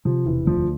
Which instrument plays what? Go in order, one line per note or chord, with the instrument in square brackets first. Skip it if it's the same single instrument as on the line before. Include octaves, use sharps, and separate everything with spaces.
[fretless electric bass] C3 [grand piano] F3
[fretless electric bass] E1 [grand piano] E3
[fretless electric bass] D2 [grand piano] F3